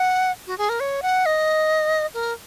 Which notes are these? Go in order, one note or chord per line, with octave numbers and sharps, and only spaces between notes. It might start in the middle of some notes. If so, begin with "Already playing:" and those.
Already playing: F#5
F#4
G#4
A#4
C#5
F#5
D#5
A#4